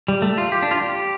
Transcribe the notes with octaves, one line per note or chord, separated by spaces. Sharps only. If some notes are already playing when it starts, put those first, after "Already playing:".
G3
A3
F4
G4
D4
F4
G4